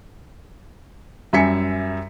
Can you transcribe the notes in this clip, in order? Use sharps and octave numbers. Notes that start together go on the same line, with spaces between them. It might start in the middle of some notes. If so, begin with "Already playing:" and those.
F#2 G3 E5 G#5 B6 C#7